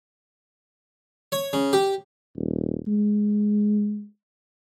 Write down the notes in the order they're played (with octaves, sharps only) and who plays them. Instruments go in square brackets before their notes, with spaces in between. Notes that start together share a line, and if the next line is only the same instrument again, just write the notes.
[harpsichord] C#5
C#3
G4
[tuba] D#1
G#3